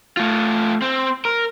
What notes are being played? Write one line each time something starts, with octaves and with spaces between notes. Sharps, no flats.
A3 F4
C4
A#4